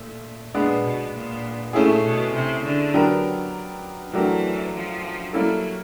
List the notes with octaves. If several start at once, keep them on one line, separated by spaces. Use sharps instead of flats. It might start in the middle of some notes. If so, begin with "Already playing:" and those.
Already playing: A#2 A3
A#2 G#3 B3 D4
B2
A#2
A#2 A3 C#4 E4 G#4
B2
C3
D3
F#3 B3 D4 G4 A#4
E3 F#3 A3 D4 G4 A#4
F3
F#3 G3 A#3 C#4 E4 A4